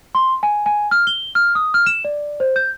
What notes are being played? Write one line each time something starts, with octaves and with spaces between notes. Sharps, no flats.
C6
G#5
G#5
F6
G7
F6
D#6
F6
E7
D5
C5
G6